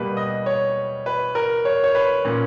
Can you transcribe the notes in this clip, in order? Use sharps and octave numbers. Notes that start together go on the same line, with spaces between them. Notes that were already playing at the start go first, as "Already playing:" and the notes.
Already playing: B2 G3 A#3 B4
D#5
C#5
B4
A#4
C#5
C#5
B4
A#2 A#3 C#4